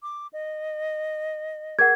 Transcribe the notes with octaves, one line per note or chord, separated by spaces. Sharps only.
D6
D#5
G#4 A#4 F#5 G#6